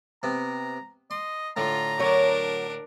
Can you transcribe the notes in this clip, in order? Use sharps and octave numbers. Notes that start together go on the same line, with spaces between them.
C3 B3 A#5
D#5 C6
A2 D3 F4 A#5
F#3 D4 A#4 C#5